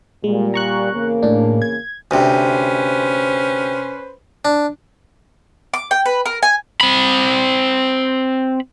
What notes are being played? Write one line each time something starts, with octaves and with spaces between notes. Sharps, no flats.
A#2 G3 G#3
A#5 C#6 F#6
E2 C#3 A#3
A2 D4
G#6
D2 C3 C#4 B4 C5
D4
D6
G5
B4
A#4
G#5
C4 B5